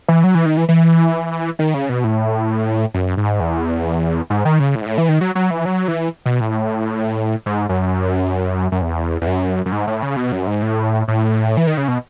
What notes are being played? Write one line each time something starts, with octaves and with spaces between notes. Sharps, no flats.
E3
F#3
E3
D#3
E3
E3
D#3
C#3
B2
A2
F#2
G#2
E2
G#2
D#3
C#3
A2
G#2
A2
E3
D#3
F#3
F#3
E3
F#3
E3
B2
A2
G#2
F#2
F#2
E2
E2
F#2
F#2
G#2
A2
C#3
B2
F#2
G#2
A2
A2
E3
D#3
C#3
B2